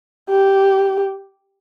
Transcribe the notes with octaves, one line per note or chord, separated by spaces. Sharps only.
G4